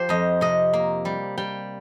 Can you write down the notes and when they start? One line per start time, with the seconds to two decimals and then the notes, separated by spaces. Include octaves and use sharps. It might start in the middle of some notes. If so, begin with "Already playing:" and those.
Already playing: F3 G4 C5
0.09 F2 D#5
0.41 C3 D#5
0.73 A#3
1.05 G3
1.38 G3 G5